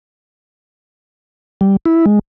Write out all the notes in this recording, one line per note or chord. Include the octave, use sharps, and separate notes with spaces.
G3
E4
G#3